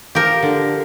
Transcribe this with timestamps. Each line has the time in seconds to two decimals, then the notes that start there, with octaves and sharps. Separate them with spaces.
0.15 F3 G4 A#4
0.42 D3